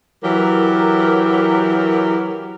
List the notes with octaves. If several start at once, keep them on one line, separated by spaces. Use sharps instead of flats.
E3 F#3 G4 A#4